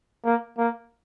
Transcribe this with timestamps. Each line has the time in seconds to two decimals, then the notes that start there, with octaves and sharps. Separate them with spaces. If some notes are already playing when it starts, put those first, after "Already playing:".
0.25 A#3
0.58 A#3